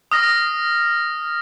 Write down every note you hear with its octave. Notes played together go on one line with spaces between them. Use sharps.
D#6 F6 A#6